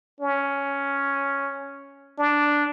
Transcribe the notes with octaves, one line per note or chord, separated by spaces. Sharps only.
C#4
D4